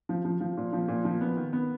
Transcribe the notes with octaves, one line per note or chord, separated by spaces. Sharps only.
F3
F3
F3
A#2
F3
A#2
F3
B3
D#3
B3